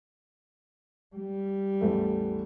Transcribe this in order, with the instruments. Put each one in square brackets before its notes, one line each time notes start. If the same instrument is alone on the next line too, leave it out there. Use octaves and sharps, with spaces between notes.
[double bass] G3
[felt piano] A1 E2 A3